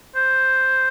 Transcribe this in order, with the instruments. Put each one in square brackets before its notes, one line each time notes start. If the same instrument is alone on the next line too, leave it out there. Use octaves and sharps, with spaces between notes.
[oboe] C5